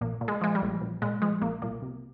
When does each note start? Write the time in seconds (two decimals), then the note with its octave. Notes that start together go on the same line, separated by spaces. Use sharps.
0.01 A#1 A#2 A#3
0.21 A#2
0.28 G#3
0.41 F3 G#3
0.55 G3
0.62 A#1
0.81 A#1
1.02 A#2 G#3
1.22 F3 G#3
1.41 A#1 A#2 A#3
1.62 C2 A#2 A#3
1.82 C3